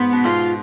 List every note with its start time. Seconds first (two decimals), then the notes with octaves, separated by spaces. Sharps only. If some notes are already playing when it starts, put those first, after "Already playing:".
Already playing: G#2 B3
0.13 B2
0.24 G#2 F4